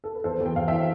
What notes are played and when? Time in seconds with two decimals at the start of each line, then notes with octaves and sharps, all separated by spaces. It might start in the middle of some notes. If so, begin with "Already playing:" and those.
0.04 A4
0.15 B4
0.24 E2 A4 C5
0.40 E2
0.46 G5
0.56 E2 F5
0.68 E3 E5 G5